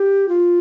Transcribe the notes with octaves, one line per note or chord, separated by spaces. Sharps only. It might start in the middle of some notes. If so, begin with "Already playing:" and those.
Already playing: G4
F4